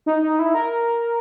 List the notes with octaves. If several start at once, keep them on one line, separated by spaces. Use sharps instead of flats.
D#4
D#4
E4
A#4